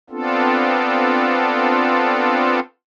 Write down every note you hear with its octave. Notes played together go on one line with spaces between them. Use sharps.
B3 C4 D4 F4 A4